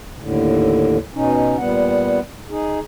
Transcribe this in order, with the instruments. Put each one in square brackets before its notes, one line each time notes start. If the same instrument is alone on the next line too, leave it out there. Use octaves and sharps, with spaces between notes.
[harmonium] D#2 A2 D3
B2 C#4 D#4
A#2 G3 B3 F#5
D#4 G#4